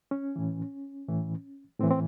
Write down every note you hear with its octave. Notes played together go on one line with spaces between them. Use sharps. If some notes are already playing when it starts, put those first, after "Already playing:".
C#4
A2 E3
A2 E3
A2 E3 C4
C4